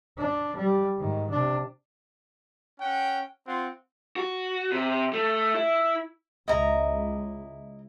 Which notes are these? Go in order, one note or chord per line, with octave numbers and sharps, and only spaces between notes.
D4
G3
G#2 D#3
C3 D4
C#4 F#5 G5
C4 F4 F#5
F#4
C3
A3
E4
C#2 E4 D#5 A#5